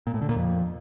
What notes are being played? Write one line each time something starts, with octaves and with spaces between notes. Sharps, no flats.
A#2
A2
D3
A#2
F2